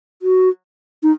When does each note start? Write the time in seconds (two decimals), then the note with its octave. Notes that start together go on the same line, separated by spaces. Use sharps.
0.22 F#4
1.03 D#4